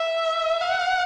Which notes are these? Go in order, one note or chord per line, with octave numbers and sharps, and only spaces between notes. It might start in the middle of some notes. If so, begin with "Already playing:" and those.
Already playing: E5
F#5